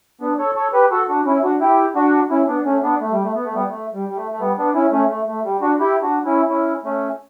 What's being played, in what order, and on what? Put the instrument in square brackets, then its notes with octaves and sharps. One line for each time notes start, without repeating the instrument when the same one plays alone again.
[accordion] B3 D4
A4 C#5
A4 C#5
G4 B4
F#4 A4
D4 F#4
C#4 E4
D4 F#4
E4 G4
D4 F#4
C#4 E4
B3 D4
A3 C#4
B3 D4
A3
G3
A3
B3
A3
G3 B3
A3
G3
G3
A3
A3
G3 B3
B3 D4
C#4 E4
A3 C#4
A3
A3
G3
D4 F#4
E4 G4
D4 F#4
C#4 E4
C#4 E4
A3 C#4